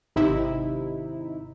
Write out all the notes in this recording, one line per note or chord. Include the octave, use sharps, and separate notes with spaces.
G#1 C3 D#4 E4